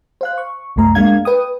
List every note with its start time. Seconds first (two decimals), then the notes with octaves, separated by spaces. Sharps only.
0.21 C5 F5 F#6
0.38 C#6
0.76 C2 F#2 A3 A#5
0.95 G#3 A#3 D4 F5 G#6
1.25 B4 G5 D#6